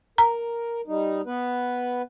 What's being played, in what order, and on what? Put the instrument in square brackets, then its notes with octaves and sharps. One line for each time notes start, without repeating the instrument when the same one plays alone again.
[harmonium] A#4 [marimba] A#5
[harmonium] G3 D#4
B3 B4